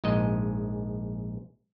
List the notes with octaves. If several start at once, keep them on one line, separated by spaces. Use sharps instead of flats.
A#1 G#2 G#3 D#5